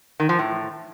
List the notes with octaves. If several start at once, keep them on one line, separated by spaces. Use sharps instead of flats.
D#3
F3
A2